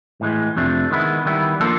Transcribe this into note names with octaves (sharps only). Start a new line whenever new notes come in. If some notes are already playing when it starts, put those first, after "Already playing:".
A2 E3 G#3
F2 C3 F3 A3 D4
D#3 G#3 B3 E4
D#3 G3 B3 E4
F3 A#3 D4 F4 A4